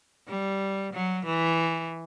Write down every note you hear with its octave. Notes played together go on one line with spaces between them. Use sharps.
G3
F#3
E3